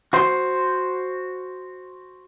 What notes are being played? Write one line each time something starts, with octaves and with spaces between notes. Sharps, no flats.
F#4 C5